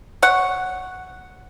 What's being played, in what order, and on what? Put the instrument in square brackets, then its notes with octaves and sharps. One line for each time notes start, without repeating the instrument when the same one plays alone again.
[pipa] C#5 F#5